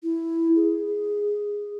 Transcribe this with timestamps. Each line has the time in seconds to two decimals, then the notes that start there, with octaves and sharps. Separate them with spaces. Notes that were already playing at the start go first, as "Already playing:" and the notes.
0.03 E4
0.56 G#4